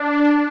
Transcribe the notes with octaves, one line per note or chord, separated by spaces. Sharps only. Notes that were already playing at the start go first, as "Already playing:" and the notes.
Already playing: D4